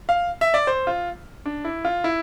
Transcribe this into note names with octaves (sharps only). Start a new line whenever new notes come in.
F5
E5
D5
C5
F4
D4
E4
F4
E4